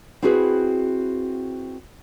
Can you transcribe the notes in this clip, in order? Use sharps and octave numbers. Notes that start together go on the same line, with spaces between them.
C4 E4 F#4 G#4 B4